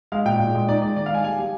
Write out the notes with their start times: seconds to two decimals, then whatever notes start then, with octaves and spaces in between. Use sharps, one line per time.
0.12 G#3 F5
0.25 A#2 G5
0.39 A#2
0.55 G#3
0.69 D#4 D5
0.82 G#3 D5
0.96 D#3 D5
1.06 F5
1.10 G#3 G#5
1.24 G3 G#5
1.38 G3